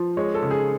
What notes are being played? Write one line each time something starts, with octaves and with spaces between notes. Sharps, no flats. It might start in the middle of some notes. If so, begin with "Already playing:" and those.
Already playing: F3
G#3 C#5
A4
C#3
G#4